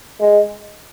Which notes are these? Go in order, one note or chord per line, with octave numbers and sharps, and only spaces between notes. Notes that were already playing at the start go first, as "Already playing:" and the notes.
G#3